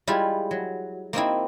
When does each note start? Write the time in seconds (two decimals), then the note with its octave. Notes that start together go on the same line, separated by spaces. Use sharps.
0.07 G3 G#3 E4 F4
0.51 F#3
1.13 A#3 C4 D#4 E4